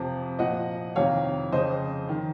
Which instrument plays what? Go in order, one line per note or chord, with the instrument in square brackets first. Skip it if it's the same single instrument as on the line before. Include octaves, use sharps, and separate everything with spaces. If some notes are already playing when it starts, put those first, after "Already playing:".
Already playing: [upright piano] F2 C3 F3
A#2 F3 D#5 F#5
F2 C3 D#3 C#5 F5
F2 C#3 F3 C5 D#5
D#3